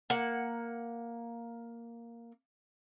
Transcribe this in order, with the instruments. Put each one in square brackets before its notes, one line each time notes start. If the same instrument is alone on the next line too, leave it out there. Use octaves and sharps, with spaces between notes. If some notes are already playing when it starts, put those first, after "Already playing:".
[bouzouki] A#3 F#5